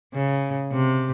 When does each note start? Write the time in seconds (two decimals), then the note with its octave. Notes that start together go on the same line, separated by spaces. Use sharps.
0.14 C#3
0.72 C3